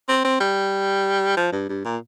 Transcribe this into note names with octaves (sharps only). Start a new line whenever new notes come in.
C4
C4
G3
F3
G2
G2
A#2